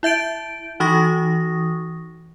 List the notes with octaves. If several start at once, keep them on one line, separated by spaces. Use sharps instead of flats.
E4 E5 G6 D7
E3 D#4 F#4 C#6 D#6 A#6